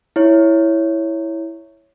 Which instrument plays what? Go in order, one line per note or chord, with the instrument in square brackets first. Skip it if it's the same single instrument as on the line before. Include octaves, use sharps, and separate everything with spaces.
[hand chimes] E4 C#5